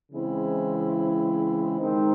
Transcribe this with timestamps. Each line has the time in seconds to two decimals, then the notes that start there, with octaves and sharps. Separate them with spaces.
0.12 C#3 E3 G#3 C4 E4
1.80 D#3 G#3 C4 D#4